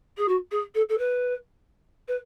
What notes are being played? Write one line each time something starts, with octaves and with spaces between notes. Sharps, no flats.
G#4
F#4
G#4
A4
A4
B4
B4